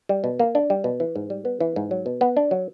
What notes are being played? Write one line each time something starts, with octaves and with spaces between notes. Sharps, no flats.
G3
B2
A#3
D4
G3
B2
E3
G#2
G3
B3
E3
G#2
F#3
B2
B3
D4
F#3